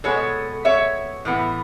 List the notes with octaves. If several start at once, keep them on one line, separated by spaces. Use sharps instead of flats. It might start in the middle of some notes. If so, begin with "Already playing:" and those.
B2 G#3 B3 A4 C#5
C#5 E5
A2 E3 B3